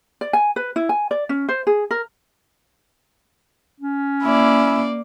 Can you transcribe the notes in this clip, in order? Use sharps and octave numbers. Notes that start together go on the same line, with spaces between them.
D5
G#5
B4
E4
G#5
D5
C#4
C5
G#4
A#4
C#4
A#3 E4 D5